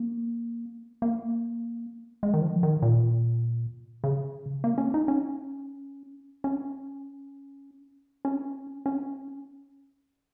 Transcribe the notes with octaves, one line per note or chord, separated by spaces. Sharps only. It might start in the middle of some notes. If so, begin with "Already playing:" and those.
Already playing: A#3
A#3
G#3
D#3
F3
D#3
A#2
C#3
A#3
C#4
D#4
C#4
C#4
C#4
C#4